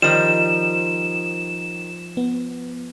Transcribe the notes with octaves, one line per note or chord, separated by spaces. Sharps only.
D#3 F3 G3 E7
B3